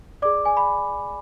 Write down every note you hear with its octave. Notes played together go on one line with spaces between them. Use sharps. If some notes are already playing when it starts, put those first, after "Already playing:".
G#4 D5 D6
G#5
B5